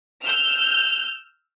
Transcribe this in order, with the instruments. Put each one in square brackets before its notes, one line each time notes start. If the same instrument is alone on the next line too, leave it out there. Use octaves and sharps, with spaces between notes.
[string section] E6 F6 G6